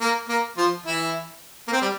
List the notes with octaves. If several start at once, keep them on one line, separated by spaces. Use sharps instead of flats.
A#3
A#3
F3 F4
E3 E4
A#3
C4
G3